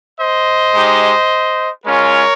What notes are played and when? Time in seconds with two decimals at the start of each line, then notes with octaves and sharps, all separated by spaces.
0.18 C5 D#5
0.74 G#3 D#4 G4
1.85 G#3 C#4 F4 A#4 C#5